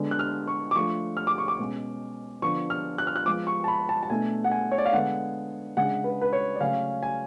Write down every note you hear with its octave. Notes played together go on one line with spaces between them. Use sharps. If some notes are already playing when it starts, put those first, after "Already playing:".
Already playing: D3 G#3 B3 D4
F#6
F6
C#6
D6
F3 A3 D4 C#6
F6
D6
C#6
D6
B2 G#3 C#4
D3 F3 B3 D4 C#6
F6
F#6
F6
F#6
F3 G#3 B3 D6
C#6
A5
B5
A5
A5
B2 A3 D4 G#5
F#5
G#5
C#5
D5
F5
D3 G#3 B3 F#5
C#3 G#3 D4 F#5
B4
B4
C#5
D5
C#3 F#3 A3 C#4 F5
G#5